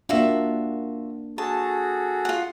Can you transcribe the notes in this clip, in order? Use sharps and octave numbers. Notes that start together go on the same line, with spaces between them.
A#3 D4 F4 F#4 E5
F#4 G#4 A4 A5
F4 F#5